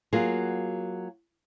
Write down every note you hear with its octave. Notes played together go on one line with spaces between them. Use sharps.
F#3 A#3 F4 F#4 G#4